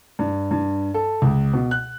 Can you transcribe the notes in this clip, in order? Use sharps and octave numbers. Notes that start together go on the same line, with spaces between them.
G2
G2
A4
C#2
B2
F#6